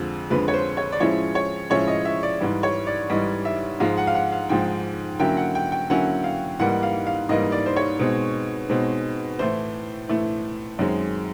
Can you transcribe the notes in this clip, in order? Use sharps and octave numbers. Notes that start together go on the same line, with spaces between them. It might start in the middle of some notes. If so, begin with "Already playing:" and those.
Already playing: F2 D3 F3 G#3
F2 D3 F3 G#3 B4
C#5
C5
C#5
D5
A2 F3 G#3 C#4 E4 C#5
C#5
A2 F3 G#3 C#4 E4 C#5
D#5
E5
D5
G#2 E3 G3
C#5
D5
G#2 E3 G3 D#5
E5
G#2 F3 G#3 F5
F#5
F5
F#5
F5
G#2 F3 G#3 G5
D3 F#3 A#3 C#4 E4 G5
F#5
G5
G5
D3 F#3 A#3 C#4 E4 F#5
F5
G#2 E3 G3 A#3 D#4 F#5
F5
F5
G#2 E3 G3 A#3 D#4 D#5
D5
C5
C#5
B2 G#3 C4 D#4
B2 G#3 C4 D#4
A2 E3 A3 C5
A2 E3 A3
F#2 D#3 G#3 C4